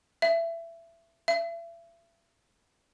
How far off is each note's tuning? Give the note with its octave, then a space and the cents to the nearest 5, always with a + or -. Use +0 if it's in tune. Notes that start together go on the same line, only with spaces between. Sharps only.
E5 +20
E5 +35